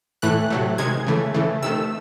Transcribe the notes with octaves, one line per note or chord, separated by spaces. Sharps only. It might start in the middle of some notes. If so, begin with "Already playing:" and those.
A2 E3 A3 F#6
C3 F#3 A3
C3 D#3 G#3 G#6
C#3 E3 A3
C#3 E3 A3
C3 D#3 A3 E6